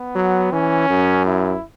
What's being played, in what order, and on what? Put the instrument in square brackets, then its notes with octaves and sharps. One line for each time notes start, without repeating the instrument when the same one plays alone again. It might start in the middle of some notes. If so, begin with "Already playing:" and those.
Already playing: [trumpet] B3
[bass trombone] F#3
[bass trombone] E3 [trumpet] C#4
[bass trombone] F#2
[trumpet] E4